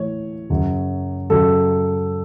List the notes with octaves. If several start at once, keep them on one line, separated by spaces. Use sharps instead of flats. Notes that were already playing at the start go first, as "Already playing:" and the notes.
Already playing: A2 E3 C#5
F#2 C#3 F#3
F#2 C#3 F#3 A4